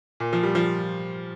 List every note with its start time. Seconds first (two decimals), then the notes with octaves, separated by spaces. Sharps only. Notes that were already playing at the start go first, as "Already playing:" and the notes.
0.20 A#2
0.33 F3
0.43 G3
0.55 F3